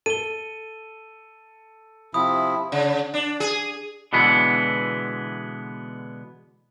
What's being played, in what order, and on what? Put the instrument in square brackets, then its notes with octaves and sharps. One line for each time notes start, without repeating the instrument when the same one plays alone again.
[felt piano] A4 [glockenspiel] D#7 G7
[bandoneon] C3 F3 E4 [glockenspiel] D#6
[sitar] C#3
D4
G#4
[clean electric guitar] B2 D3 E3 G#3 B3